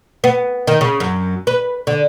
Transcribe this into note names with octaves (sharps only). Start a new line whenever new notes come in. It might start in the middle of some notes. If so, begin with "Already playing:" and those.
B3
D#3
C#3
F#2
B4
D3